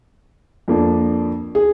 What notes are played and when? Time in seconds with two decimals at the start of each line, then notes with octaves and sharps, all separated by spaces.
0.68 F2 F3 A#3 D4
1.55 G#4